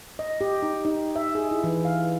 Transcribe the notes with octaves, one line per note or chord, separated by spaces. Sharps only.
D#5
G4
D#4
D#4
E5
G#4
E4
E3
F5